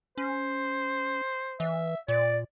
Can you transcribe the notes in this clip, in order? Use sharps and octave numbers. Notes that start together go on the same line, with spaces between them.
C#4 C5
E3 E5
A#2 D5